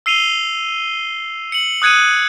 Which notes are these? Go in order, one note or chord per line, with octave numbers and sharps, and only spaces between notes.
E6 C7 D#7 F7 G7
C#7 F#7
D#6 F#6 G#6 C#7 D#7